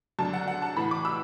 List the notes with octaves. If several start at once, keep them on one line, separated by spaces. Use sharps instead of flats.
F#2 D3 A5
F#5
F#5
A5
A2 E3 B5
D6
E6